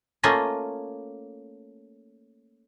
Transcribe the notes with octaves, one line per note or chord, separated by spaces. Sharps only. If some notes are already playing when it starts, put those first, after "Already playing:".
A3 A#3 C#4 F4 D#5